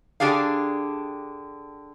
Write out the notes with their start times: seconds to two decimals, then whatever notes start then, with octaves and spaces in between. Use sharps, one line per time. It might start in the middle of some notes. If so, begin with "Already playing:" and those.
0.20 D3 D4 G4 G#4 F5